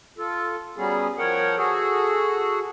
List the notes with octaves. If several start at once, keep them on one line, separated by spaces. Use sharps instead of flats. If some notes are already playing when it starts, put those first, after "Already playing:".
F4 A4
F#3 G3 B3 C#4 G#4
F3 A#4 C#5 F#5 G5
F#4 G#4 A4